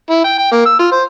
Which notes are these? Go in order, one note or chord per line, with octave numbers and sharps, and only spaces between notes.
E4
G5
G5
A#3
E6
F4
C5